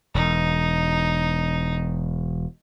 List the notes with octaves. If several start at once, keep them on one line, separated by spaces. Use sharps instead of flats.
E1 D#4